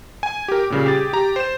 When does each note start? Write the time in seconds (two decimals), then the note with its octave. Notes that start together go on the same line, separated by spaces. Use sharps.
0.23 G#5
0.48 G4 A#4
0.70 A#2 C#3 G3
0.86 G4 G#4 A6
1.13 G4 A#5
1.36 C5 E7